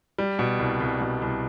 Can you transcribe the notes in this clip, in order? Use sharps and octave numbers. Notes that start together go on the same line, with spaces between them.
G3
B2
C2
C2
B2
C2